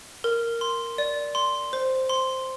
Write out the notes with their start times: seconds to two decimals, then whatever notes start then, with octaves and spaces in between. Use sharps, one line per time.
0.24 A#4
0.61 C6
0.98 D5
1.35 C6
1.73 C5
2.10 C6